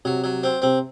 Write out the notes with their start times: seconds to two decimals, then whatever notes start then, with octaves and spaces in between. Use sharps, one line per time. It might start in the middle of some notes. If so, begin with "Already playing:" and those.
0.05 C3 F#3
0.24 F#3
0.43 C4
0.62 C3 C4